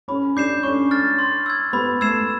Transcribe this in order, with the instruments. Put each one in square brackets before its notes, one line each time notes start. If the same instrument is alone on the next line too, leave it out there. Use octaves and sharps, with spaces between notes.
[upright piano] C#4 [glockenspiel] B5
[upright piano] D4 [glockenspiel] D6 G6 C7 E7
[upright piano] C#4 [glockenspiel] C#6
[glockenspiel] F6 A6
C6
E6 G#6
[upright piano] B3 [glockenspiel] B5
[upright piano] A3 [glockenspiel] E6 G#6 C7 E7